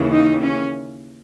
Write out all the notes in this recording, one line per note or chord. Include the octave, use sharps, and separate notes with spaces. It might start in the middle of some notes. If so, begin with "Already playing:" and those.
Already playing: D#2 C#3 E3
D#4
C#4